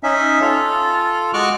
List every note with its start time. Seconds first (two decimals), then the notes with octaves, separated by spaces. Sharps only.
0.03 C#4 D#4 E5
0.41 F4 A4
1.34 G#3 F#4 C#6 D6 F6 F#6